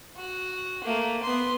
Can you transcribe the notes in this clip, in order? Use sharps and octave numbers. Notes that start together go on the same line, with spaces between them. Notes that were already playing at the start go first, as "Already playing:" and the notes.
F#4
A3 A#3
B3 C6